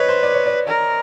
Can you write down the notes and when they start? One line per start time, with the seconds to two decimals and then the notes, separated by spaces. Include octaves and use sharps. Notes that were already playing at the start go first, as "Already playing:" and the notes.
Already playing: B4 C#5 D#5
0.09 C5
0.23 D5
0.34 C#5
0.46 D5
0.67 A#4